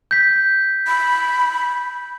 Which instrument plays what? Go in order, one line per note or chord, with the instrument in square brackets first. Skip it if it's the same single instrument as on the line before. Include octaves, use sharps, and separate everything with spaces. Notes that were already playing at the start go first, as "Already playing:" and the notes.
[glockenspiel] G6 B6
[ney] B5